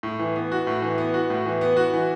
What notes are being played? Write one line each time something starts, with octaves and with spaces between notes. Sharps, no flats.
A2
E3
B3
F#4
A2
E3
B3
F#4
A2
E3
B3
F#4
E3